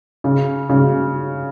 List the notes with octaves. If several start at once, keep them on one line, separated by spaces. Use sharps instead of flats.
C#3
C#3